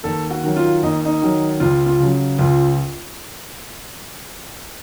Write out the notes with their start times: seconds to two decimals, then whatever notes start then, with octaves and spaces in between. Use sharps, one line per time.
0.04 D#2 A4
0.30 F#4
0.44 D#3 F#3
0.56 F4
0.83 D#2 D#4
1.05 D#4
1.22 D#3 F#3
1.60 C#2 F4
1.86 F4
2.00 C#3 F#3
2.38 C#2 F4